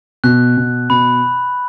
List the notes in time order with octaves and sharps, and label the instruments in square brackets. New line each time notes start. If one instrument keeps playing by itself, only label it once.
[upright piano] B2 [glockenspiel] F#6
[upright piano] B2
[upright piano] B2 [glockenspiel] B5